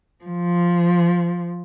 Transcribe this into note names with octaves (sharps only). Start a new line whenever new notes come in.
F3